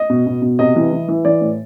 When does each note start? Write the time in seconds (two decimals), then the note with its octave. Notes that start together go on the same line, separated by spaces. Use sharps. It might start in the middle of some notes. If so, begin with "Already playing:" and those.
Already playing: D#5
0.10 B2
0.26 B2
0.42 B2
0.59 C3 D#5
0.76 E3
0.92 E3
1.08 E3
1.25 E3 D5
1.41 A2